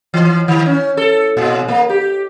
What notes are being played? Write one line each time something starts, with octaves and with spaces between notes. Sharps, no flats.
E3
D#3
C#4
A4
A#2
A#3
G4